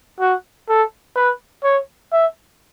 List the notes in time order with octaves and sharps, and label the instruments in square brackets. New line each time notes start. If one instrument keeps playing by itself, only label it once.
[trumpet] F#4
A4
B4
C#5
E5